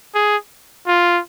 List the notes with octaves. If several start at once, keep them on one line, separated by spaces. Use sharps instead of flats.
G#4
F4